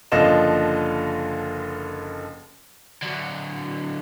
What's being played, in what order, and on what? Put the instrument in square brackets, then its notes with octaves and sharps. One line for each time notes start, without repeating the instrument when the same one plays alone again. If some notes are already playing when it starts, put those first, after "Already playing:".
[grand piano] F#1 D3 F3 F4 D#5 E7
[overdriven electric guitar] D3 F#3